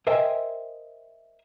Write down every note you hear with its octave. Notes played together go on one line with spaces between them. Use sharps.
A#4 C5 D#5 E5 G5 G#5